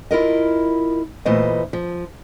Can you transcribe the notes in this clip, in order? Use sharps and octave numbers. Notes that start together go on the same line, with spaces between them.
E4 F4 A#4 D#5
A#2 E3 A3 B3 C5 D#5
F3